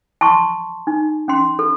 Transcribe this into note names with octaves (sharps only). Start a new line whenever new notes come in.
A5 C6 C#6
D#4
C#4 C6
A4